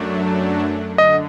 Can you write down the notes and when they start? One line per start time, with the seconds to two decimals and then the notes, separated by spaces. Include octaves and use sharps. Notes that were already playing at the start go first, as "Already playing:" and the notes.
Already playing: F#2 F#3 A3 D4
0.98 D3 D#5